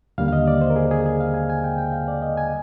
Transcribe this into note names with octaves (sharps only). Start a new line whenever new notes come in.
D#2 D3 G3 A#3 F5
F5
D#5
D5
C5
A#4
G#4
G#4
G#4
F5
G#5
G#5
G5
G5
F5
D5
D#5
G#5